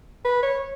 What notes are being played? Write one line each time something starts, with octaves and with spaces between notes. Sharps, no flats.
B4
C#5